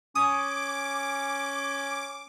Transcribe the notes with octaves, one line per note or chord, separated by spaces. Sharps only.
C#4 D6 D#6